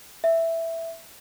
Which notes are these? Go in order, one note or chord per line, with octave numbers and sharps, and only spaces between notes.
E5